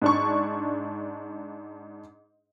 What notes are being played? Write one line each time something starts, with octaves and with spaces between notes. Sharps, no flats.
G#2 D4 C#6